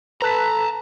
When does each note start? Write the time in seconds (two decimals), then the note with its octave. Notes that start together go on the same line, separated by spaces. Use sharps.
0.22 A4 B4 A5 A#5 F#6 B6